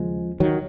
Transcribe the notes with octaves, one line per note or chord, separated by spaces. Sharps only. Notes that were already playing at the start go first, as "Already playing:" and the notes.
Already playing: D#2 C#3 F3 G#3
D#3 F#3